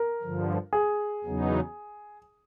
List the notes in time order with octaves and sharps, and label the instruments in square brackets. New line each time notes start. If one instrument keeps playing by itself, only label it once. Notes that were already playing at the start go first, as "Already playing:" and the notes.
Already playing: [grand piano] A#4
[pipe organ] G2 D3 F3
[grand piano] G#4
[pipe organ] E2 C#3 F#3 B3 D#4